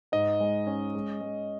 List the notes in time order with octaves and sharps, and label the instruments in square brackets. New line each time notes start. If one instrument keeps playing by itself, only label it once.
[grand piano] G#2 [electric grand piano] D#5
[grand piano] G#3
C#4
G#3
G#3